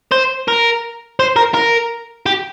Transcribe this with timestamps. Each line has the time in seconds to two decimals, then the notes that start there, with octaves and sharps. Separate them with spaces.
0.12 C5
0.48 A#4
1.20 C5
1.36 A#4
1.54 A#4
2.26 G4